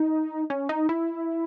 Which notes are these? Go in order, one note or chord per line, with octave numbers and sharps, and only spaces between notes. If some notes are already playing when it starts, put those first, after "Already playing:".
Already playing: D#4
C#4
D#4
E4